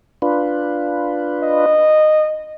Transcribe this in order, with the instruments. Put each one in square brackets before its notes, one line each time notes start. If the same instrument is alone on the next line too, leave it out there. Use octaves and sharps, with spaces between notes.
[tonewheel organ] D4 F4 B4
[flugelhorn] D#5